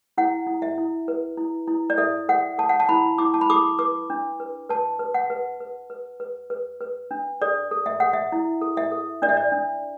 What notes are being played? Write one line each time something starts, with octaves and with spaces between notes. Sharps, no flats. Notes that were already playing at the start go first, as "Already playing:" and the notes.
E4 F#5
E4
E5
E4
B4
E4
E4
D5
A4 E5
A4 F#5
A4 A5
F#5
A5
E4 B5
E4 D6
A5
B5
A4 D6
B4 D6
D4
B4
B4 A5
B4
F#5
B4
B4
B4
B4
B4
B4
D4
A4 D5
A4
E5
A4 F#5
E5
E4
A4
E5
A4
D4 D5
E5
D5
D4